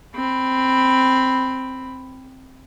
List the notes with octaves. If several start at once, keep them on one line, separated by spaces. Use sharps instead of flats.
C4 B5